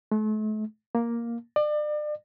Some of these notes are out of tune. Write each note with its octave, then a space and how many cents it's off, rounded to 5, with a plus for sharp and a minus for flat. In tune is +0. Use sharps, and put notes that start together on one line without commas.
A3 -40
A#3 +5
D5 +35